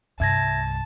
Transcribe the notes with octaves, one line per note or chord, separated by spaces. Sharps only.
C2 G2 E5 A5 G#6 A#6